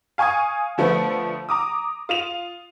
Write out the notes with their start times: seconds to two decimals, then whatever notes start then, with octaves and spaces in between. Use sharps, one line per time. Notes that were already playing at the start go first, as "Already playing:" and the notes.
0.18 F5 G#5 C#6 D#6 G#6
0.78 D3 F3 A3 B3
1.49 A#5 D6 D#6
2.09 F4 D#7 F7